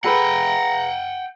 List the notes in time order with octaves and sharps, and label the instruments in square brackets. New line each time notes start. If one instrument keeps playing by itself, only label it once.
[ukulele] G#4 A4 B4 [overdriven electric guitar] F#5 G5 [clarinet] A#5